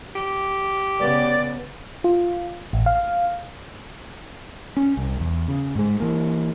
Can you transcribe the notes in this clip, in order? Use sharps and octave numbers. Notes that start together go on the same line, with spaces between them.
G4
C#3 B3 D5
F4
A1
F5
C#4
C2
E2
C#3
G#2 G#3
E3 A#3